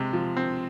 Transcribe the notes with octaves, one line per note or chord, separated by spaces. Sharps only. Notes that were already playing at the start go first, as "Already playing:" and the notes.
Already playing: C3 G#3
F3
C4